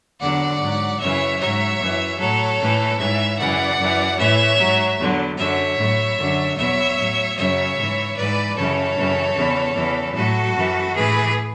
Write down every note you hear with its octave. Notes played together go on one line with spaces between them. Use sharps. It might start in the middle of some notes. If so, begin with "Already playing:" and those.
E2 D3 F#3 D5 F#5
G#2 F#3
F#2 C#3 E3 C#5 E5
G#2 F#3 C#5 E5
F#2 E3
A2 F#3 A4 C#5
A2 E3
G#2 E3 C#5 E5
F#2 C#3 E3 D5 F#5
F#2 E3
A2 E3 C#5 E5
G#2 F#3
E2 D3 F#3
F#2 D3 F#3 C#5 E5
A2 F#3
F#2 D3 F#3
E2 B2 F#3 C#5 E5
A2 F#3
F#2 C#3 F#3 C#5 E5
G#2 E3
G#2 E3 B4 D5
F#2 C#3 E3 A4 C#5
F#2 C#3 E3
E2 C#3 E3
E2 C#3 E3
A2 F#3 F#4 A4
F#2 E3
A2 E3 G#4 B4